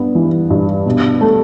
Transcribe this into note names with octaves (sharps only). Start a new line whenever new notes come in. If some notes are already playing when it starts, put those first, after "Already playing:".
Already playing: G2 B3
E3
G2
B2
A3